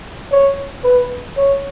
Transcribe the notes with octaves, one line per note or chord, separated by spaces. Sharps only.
C#5
B4
C#5